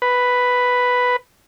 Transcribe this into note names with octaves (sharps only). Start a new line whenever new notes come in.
B4